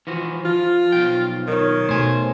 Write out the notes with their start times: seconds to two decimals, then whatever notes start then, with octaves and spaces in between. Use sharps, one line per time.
0.07 E3 F3 F#4
0.45 F3 F4
0.92 B1 F3 G5
1.47 D#3 A#4 C#5
1.89 B2 A3 C5 G#5